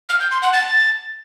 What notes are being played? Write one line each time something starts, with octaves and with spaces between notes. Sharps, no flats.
F6
G6
C6
F#5
A6